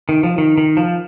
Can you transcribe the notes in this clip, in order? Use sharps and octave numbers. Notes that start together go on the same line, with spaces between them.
D#3
F3
D#3
D#3
F3